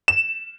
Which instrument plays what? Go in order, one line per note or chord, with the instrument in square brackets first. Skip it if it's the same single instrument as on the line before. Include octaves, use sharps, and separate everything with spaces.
[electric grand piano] E7